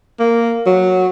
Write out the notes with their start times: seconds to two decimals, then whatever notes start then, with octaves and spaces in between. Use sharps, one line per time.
0.19 A#3
0.66 F#3